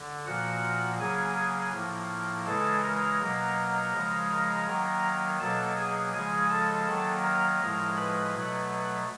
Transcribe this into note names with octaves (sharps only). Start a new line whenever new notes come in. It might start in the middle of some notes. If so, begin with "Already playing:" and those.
Already playing: D3
A#2 F3 A#3 F#4 F#5
C#3 F#3 A#3 G#4 G#5
G#4 G#5
A2 F3 A#3
C#3 E3 G#3 A4 A5
A#4 A#5
B2 F#3 A#3
C#3 F3 G#3
A#4 A#5
D#3 F#3 A#3
B2 F#3 A#3 A4 A5
G#4 G#5
C#3 F3 G#3 G#4 G#5
A4 A5
D#3 F#3 A#3
A#4 A#5
A2 F3 G#3
B4 B5
B2 F#3 A3